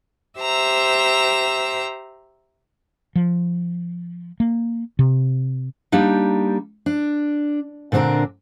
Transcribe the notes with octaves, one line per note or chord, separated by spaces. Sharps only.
G4 C5 E5 A#5 E6
F3
A#3
C3
G3 A#3 D4 D#4
D4
A#2 D3 C4 D4 A#4